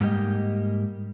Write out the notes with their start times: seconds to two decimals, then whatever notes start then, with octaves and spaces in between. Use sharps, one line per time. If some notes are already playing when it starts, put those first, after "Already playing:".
0.01 G#2 G3 A#3 G4 D#5